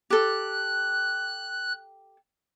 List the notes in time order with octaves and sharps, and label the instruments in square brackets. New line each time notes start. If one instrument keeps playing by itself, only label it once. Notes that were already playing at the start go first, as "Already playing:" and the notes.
[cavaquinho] G4 A4 [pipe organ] F#6